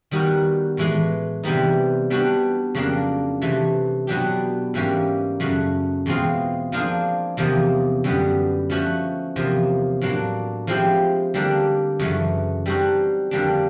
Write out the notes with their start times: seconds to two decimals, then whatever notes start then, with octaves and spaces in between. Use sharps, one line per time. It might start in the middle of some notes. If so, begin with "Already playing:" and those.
0.11 D#3 G3 B3 D#4 F#4
0.77 A2 E3 G#3
1.43 C3 E3 G3 B3 D#4
2.10 G3 B3 D4 F#4
2.74 F2 C#3 F#3 A#3 D4
3.41 C3 E3 A3
4.07 B2 F#3 B3 D4 G4
4.74 G#2 E3 G3 A#3 C#4
5.40 F#2 C#3 F#3 A3
6.06 E2 B2 G#3 C4 F4
6.72 F3 A#3 D4 F4 G#4
7.37 E2 C3 F3 A#3
8.04 F#2 D3 G3 B3
8.70 F3 A3 C#4 F#4
9.36 E2 C3 F3 A#3
10.01 A2 F#3 A#3 D4
10.67 F3 G#3 C4 E4 G4
11.34 D3 G3 A#3 D4
11.99 F#2 C#3 E3 A3
12.66 G3 C4 D#4 F#4 A4
13.31 F2 D3 G3 A#3 D4